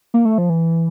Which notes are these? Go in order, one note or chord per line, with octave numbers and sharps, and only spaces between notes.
A#3
A3
F3
E3